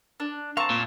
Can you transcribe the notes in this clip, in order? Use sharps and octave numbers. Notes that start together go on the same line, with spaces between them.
D4
C4 F5 A5 A#5 C#6
A#2